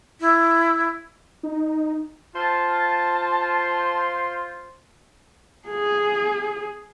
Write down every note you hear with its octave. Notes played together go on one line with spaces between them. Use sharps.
E4
D#4
F4 C5 A5
G#4